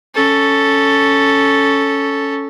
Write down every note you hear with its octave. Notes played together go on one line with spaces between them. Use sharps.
C#4 A4